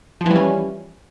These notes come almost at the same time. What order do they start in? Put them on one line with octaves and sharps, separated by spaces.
F3 E3 G3 C#4